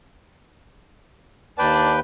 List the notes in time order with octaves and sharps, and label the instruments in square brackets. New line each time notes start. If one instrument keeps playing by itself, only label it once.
[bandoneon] D#2 B4 G5 [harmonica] D5 A5